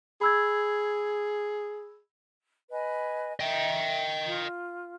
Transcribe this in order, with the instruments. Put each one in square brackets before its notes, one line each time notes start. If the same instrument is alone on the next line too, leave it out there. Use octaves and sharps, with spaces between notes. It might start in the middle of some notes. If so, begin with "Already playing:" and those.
[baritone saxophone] G#4 [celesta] B5 E6 G#6
[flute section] B4 D#5 G#5
[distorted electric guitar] D#5 G5 [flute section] E5
[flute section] F4